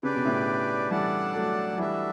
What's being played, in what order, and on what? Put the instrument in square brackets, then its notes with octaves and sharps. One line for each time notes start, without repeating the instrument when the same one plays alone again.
[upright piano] C#3 [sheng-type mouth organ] D4 G4 B4 D5
[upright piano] B2
A2 C#3
[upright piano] E3 G3 [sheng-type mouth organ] D4 A4 D5 F#5 A5
[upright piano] F#3 A3
F#3
[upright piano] E3 G3 [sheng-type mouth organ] D4 F#4 A4 E5